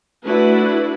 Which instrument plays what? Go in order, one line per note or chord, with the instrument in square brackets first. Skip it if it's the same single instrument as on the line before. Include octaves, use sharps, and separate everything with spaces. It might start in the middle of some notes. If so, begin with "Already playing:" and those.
[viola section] A3 D4 E4 F#4 B4